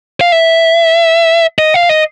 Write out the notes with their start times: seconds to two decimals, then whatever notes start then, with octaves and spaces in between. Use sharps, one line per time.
0.21 F5
0.32 E5
1.59 D#5
1.74 F5
1.89 D#5